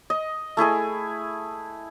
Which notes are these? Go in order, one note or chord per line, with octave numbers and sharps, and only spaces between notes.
D#5
A3 E4 G#4 G#5